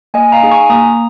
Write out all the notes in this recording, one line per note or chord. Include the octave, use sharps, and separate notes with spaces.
A#3 D#5 G#5
F5 A#5
D#4 G#4
G#5 C#6
A#3 A#5 D#6